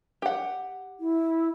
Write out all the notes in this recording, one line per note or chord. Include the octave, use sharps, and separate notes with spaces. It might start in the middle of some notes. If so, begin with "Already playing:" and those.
G4 F#5
E4